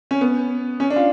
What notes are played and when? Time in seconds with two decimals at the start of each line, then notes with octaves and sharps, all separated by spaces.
0.11 C#4
0.21 B3
0.80 C#4
0.90 D4
0.96 F4